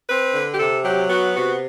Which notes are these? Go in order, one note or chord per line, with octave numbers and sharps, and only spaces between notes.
C4 B4
D3
G4
C3 A4
F#3 G4
B3 F#4
C3 F#4